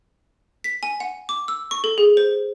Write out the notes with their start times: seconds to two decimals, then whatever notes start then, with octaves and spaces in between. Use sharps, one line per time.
0.64 B6
0.83 G#5
1.00 F#5
1.29 D6
1.48 E6
1.71 C#6
1.84 A4
1.98 G#4
2.17 C5